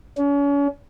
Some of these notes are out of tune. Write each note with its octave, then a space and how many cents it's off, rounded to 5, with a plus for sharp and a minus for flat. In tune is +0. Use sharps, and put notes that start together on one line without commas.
C#4 +40